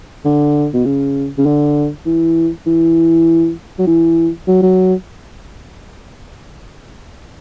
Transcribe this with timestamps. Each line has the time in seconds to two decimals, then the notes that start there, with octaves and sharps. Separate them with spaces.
0.25 D3
0.74 B2
0.85 C#3
1.38 C#3
1.46 D3
2.06 E3
2.66 E3
3.79 F#3
3.87 E3
4.47 F#3
4.62 F#3